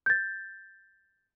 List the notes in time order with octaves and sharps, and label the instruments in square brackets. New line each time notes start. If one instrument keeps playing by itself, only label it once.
[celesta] G6 A6